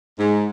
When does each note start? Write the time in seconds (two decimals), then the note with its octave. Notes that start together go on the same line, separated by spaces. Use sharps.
0.18 G#2